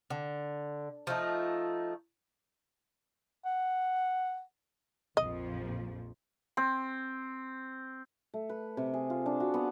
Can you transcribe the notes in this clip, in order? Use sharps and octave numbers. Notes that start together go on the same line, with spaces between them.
D3
F3 A3 D#4
F#5
A#1 F2 F3 D#5
C4
A3
B4
C3
G#4
F4
D4
F#4
B3